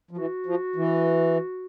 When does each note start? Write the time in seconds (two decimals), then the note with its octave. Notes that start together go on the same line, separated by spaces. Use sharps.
0.11 F3
0.17 E3 F#4
0.46 F3
0.76 E3